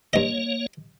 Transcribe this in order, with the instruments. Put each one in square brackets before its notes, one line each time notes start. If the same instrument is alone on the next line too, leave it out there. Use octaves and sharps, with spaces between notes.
[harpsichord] G2 D#5 [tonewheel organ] A#3 C#5